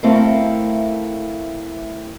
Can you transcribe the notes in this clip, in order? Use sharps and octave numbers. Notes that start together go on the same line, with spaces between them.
A3 C4 E4 A4 A#4 F5